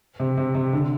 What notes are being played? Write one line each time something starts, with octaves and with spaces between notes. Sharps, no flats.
C3
C3
C3
D3